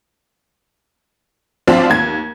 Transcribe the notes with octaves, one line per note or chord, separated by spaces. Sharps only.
B1 F3 C4 D4 F4
D#2 G#6